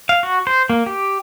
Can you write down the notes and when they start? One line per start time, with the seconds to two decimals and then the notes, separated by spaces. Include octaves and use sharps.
0.09 F5
0.23 F#4
0.47 C5
0.70 A#3
0.86 G4